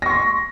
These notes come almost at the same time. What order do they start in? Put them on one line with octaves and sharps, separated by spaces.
A#6 C#6 C6